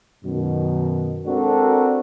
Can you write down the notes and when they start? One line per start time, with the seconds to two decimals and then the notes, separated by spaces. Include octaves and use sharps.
0.24 F#2 B2 D#3
1.26 G#3 C4 D4 F#4 A4 A#4